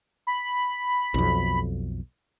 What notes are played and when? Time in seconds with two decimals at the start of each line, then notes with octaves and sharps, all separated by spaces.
0.27 B5
1.14 B1 F2